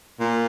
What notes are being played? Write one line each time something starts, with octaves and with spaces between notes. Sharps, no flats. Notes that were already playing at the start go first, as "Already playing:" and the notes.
A#2